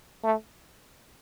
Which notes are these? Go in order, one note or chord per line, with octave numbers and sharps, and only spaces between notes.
A3